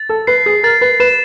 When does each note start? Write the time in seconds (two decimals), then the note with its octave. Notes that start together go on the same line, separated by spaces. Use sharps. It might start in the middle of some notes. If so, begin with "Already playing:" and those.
Already playing: A6
0.09 A4
0.27 B4 C7
0.46 G#4
0.63 A#4 A6
0.81 B4
1.00 B4 E7